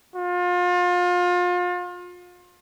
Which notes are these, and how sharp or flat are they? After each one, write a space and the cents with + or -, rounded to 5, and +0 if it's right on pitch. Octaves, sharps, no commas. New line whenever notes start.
F4 +35